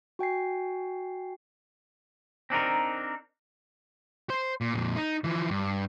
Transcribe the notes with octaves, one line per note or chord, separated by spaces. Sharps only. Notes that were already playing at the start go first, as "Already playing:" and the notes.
F#4 G5 G#5 C7
C4 D4 D#4 A#4
C5
A#2
F2 A#2
D#4
E3 F3
G2